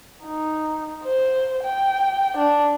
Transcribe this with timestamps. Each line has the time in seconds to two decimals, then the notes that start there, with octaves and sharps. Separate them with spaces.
0.24 D#4
1.04 C5
1.63 G5
2.37 D4